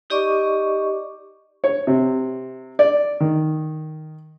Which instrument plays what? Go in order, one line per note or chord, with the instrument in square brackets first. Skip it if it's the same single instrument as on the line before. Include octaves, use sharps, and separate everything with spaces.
[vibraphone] D#4 G4 D5 D#5 C#6 D6
[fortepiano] C#5
C3
D5
D#3